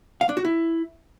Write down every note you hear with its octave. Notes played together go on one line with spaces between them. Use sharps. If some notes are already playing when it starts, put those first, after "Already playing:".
F5
D4
F#4
E4